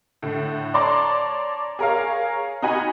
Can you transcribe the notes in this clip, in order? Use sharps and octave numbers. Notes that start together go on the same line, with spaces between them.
A2 D3
C#5 D5 A5 A#5 C6 D6
G#4 A#4 C#5 F5
D#4 F#4 G#5 B5